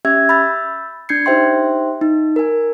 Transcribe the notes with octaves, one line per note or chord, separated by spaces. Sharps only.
C#4 G4 E5 E6 G#6
B5 E6 G6 A6
D4 G6 G#6 C7 C#7
D#4 G4 C5 E5 G5 C6
D#4
A#4 G#5